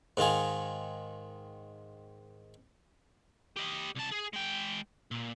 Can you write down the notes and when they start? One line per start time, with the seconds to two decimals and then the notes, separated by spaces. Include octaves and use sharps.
0.17 G#2 D#3 F4 G#4
3.57 G4 D#5
3.95 C2 A5
4.11 G#4
4.33 G#3 G5
5.11 A#2